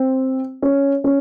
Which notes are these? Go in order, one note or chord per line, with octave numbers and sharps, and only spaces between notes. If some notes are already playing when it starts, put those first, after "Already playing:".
Already playing: C4
C#4
C#4